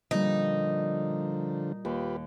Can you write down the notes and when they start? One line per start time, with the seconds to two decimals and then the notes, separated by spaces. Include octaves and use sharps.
0.11 A#2 D3 F3 G3 D#4
1.85 D#2 F4 G4 B4